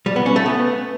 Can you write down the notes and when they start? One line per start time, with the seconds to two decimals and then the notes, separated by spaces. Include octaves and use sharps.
0.06 G3
0.16 B3
0.26 C#4
0.36 A3
0.46 B3